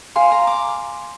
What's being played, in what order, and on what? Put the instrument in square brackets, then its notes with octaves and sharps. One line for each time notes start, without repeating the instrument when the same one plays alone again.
[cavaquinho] F5 [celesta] G#5 C6
[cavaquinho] A#5
D6